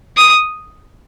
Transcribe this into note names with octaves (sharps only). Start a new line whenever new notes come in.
D#6